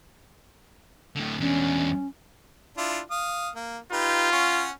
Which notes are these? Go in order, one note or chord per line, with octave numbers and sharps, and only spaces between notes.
A2 D3
E2 C#4 D4
D4 E4 F4
F5 D#6
A#3
D#4 F4 G4 B4
C#4 C#5 F#5